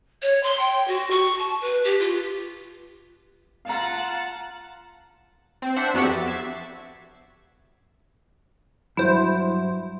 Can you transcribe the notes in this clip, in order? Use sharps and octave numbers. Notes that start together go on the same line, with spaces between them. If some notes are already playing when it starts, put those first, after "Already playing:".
C#5
C6
G5
F#4
C#6
A5
B4
G4
F4
F4 F5 F#5 A5 A#5
C4
D4 C5 E5 F#5
F2 B3 F#4 G4 E5 F#5
A6
E5 G#6 C7
G2 F#3 E4 C5